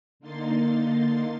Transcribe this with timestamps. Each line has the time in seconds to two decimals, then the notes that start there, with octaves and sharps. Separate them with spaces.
0.19 D3 A#3 D#4 C6 A6